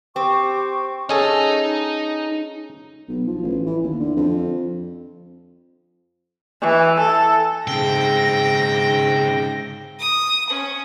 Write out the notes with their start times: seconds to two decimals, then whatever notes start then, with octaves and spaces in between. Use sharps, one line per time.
0.16 C4 G4 C#6
1.09 C#4 D#4 G#4 A4 D#5
3.08 B1
3.27 F3
3.43 A1
3.66 E3
3.83 D#2
4.00 D3
4.16 F2
6.61 E3
7.00 A4
7.68 G#2 C#3 C4 G5 A#6
9.99 D#6
10.51 C#4